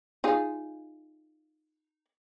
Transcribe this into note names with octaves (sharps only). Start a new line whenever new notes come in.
D#4 F4 G#4